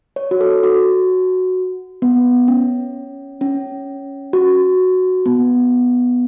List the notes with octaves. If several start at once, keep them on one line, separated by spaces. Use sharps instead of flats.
C#5
F#4
A4
F#4
B3
C#4
C#4
F#4
B3